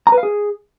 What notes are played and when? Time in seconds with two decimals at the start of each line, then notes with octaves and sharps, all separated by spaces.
0.07 A#5
0.12 B4
0.18 F5
0.23 G#4